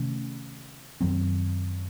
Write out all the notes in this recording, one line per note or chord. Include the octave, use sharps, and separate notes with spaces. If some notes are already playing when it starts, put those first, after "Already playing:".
Already playing: C3 D#3 A3 C#4
F#2 D#3 F#3 C4